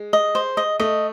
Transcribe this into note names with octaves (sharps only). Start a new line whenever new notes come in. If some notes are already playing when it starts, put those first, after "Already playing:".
Already playing: G#3
D#5
C5
D#5
A3 D#5